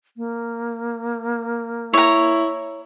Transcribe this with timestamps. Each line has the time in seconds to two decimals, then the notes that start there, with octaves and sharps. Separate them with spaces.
0.17 A#3
1.93 E4 C#5 A#5